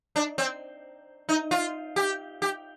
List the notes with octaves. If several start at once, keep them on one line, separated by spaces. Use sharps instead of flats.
D4
C4
D#4
F4
G4
G4